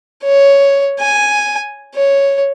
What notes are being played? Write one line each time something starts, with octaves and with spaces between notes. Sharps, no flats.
C#5
G#5
C#5